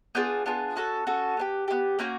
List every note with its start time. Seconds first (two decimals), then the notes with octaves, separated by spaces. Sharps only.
0.15 B3 D4 F4 G#4 G6
0.46 B3 D4 F4 G#4
0.76 C#4 F#4 A4 F#6
1.07 C#4 F#4 A4
1.37 B3 D4 G4
1.68 B3 D4 G4
1.99 A#3 C#4 F#4 G6